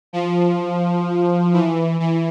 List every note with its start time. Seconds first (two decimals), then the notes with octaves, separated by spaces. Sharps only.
0.13 F3
1.53 E3
2.00 E3